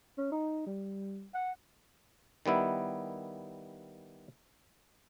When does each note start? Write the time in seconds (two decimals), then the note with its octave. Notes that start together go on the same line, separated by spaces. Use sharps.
0.18 C#4
0.32 D#4
0.67 G3
1.34 F#5
2.46 D#3 G3 B3 E4